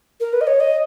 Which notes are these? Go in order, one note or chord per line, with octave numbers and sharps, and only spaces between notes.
A#4
B4
D#5
C#5
D#5